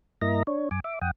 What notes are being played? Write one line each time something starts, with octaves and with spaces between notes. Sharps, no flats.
G2 A#3 E4 D#5 A#5 A#6
D4 C#5
F#2 G#5 D6
E5 D6
F2 F#5 G5 D#6